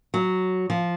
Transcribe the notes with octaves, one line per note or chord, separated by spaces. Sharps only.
F#3
F3